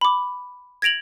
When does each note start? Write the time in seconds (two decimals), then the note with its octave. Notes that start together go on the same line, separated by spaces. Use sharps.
0.01 B5 D6
0.82 G#6 A#6 D7 F7 F#7